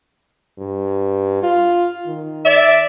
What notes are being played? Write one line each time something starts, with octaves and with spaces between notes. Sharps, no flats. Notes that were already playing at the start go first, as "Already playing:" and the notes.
G2
F4
D#3
D5 E5